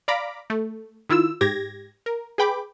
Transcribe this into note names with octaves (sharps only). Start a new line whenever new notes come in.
D5 F5 A#5 B5 D6
A3
D#3 E4 F4 E6
G#2 G4 G#6 A#6
A#4
G#4 B4 G5 B5 D6